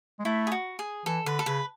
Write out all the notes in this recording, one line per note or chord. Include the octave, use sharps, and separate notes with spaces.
G#3
A3 E4
G#4
F#4
G#4
E3 A4
D3 B4
A4
C#3 B4